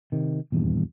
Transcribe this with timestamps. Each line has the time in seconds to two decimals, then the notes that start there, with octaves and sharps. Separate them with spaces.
0.12 C3 D#3
0.52 D#1 E2 G2